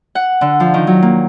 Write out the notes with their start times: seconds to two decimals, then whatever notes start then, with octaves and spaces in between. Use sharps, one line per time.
0.15 F#5
0.41 D3
0.60 F3
0.74 D#3
0.87 F#3
1.02 A#3